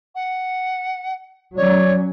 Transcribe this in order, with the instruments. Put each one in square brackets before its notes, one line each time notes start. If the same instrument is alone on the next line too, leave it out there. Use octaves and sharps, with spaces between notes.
[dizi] F#5
[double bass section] F#3 C#4 [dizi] C#5 [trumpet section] D5